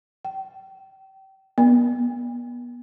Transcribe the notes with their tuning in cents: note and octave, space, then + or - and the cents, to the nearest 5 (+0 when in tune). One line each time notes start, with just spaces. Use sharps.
G5 -30
B3 -25